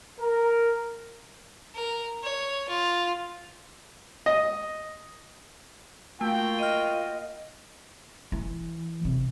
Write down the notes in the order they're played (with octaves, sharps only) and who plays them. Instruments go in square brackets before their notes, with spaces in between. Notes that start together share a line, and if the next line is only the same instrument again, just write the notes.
[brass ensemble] A#4
[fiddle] A#4
C#5
F4
[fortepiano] D#5
[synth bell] A3 [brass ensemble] A#3 F4 F#4 [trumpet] G5
[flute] D#5 [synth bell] F6 D#7
[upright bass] E3
C3